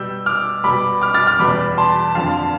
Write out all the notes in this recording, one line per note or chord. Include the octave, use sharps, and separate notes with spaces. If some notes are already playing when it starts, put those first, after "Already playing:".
Already playing: B2 G3 E6 G6
D6 F6
B2 G3 B5 D6
D6 F6
F6 A6
D6 F6
E2 B2 G3 B5 D6
A5 C6
F2 D3 F3 F5 A5